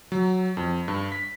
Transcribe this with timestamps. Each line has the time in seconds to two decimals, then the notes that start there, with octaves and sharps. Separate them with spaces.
0.12 F#3
0.57 F2
0.88 G2
1.12 B6